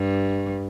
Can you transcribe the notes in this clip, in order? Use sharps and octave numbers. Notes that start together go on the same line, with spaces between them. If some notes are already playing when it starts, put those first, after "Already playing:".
Already playing: G2